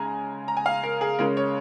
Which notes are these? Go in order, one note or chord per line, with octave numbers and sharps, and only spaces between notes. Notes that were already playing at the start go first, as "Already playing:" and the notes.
Already playing: C#3 G#3 G#5 A#5
A#5
G#5
F5
A#4
G#4
C#3 G#3 C#4 A#4
C#5